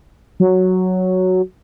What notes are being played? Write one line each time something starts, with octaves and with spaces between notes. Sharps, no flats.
F#3